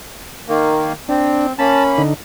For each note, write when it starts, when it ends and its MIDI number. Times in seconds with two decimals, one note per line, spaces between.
0.48 0.93 51
0.48 0.93 58
1.09 1.53 60
1.09 1.47 62
1.59 2.02 58
1.59 2.02 61
1.59 1.84 81
1.59 2.02 83
1.98 2.14 50
1.98 2.14 63